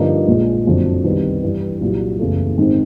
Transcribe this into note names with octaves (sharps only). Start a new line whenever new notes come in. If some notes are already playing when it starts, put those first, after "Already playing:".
Already playing: G2 D3 F3 A#3 D#4
A#1 A#2 F3 G#3
F#1 F2 D3 F#3
C2 C3 D#3 G3 B3
G2 E3 G3
C2 A#2 F#3
F#1 E2 C#3 E3 A3
G#1 G#2 D#3 G#3 C4